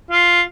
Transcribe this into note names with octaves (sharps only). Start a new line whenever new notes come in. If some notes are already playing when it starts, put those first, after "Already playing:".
F4